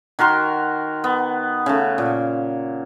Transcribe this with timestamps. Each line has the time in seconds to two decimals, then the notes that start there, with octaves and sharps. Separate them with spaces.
0.19 D#3 F#4 A#4 C6
1.04 B3
1.66 C#3 A3
1.98 A#2